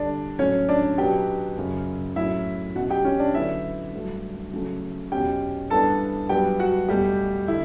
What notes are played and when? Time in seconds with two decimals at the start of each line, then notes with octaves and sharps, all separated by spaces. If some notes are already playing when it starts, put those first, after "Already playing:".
Already playing: D3 G3 D4 D5
0.39 A2 F#3 C#4 C#5
0.69 D4 D5
0.98 B2 F#3 B3 D4 G4 G5
1.58 F#2 C#3 F#3 C#4
2.16 A2 F#3 C#4 E4 E5
2.76 B2 F#3 C#4 F#4 F#5
2.90 G4 G5
3.05 C#4 C#5
3.20 D4 D5
3.34 D3 F#3 B3 E4 E5
3.93 G2 F#3 A3
4.53 C#3 F#3 A3 C#4
5.12 E2 B2 F#3 C#4 G4 G5
5.70 G2 E3 B3 D4 A4 A5
6.29 G2 F#3 B3 D4 G4 G5
6.59 F#4 F#5
6.89 E2 B2 G3 A3 G4
7.48 D3 E4